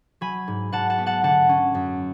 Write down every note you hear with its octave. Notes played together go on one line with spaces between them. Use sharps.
F#3 G#5 B5
G#2
G#2 F#5 A5
F#5 A5
B3
F#5 A5
D3 F#5 A5
C#4
F#2